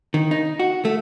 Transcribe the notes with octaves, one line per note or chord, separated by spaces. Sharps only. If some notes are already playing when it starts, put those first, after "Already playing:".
D#3
D#4
F#4
A3